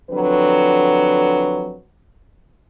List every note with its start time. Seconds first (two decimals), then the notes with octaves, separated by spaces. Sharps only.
0.11 D3 F3 F#3 C4 B4